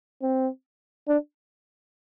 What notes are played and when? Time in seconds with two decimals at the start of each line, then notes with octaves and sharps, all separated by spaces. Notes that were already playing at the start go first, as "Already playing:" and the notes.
0.22 C4
1.08 D4